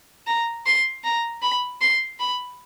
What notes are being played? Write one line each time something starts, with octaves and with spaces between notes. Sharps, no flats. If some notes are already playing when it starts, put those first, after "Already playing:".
A#5
C6
A#5
B5
C6
B5